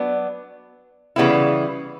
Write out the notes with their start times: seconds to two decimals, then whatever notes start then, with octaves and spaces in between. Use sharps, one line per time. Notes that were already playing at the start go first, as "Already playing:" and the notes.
Already playing: F#3 B3 D4
1.16 C#3 E3 G3 B3 E4